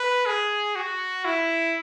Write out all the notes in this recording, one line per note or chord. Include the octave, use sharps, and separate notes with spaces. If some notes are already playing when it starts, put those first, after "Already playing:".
Already playing: B4
G#4
F#4
E4